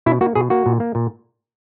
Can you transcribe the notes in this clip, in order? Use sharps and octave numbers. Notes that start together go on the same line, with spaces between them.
B2 E4
A#3 F#4
B2 G#4
A#3 F#4
A#2
A#3
A#2